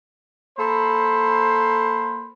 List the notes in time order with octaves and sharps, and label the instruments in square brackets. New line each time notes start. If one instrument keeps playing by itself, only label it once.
[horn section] A#3 A4 C5 B5